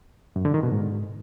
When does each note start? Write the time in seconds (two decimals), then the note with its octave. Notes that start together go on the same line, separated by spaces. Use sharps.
0.36 F#2
0.45 D3
0.54 D#3
0.63 B2
0.72 G#2